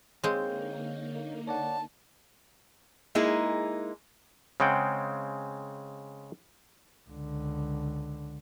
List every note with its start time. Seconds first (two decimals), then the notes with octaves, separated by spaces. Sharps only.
0.24 D3 G#3 A#3 C4 D#4 C#5 F5 G6
1.47 C#5 D5 F#5 A5
3.15 G#3 A#3 D#4 E4 G#4
4.60 C#3 G#3 C4 F#5 G5
7.10 C#2 D3